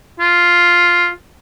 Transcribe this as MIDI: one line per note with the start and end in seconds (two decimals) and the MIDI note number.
0.20 1.09 65